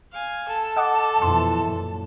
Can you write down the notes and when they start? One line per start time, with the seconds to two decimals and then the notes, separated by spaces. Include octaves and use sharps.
0.12 F5 G#5
0.48 A4 A5
0.76 D#5 F#5 D6
1.22 F2 B2 E3 C6
1.58 F#2 A#2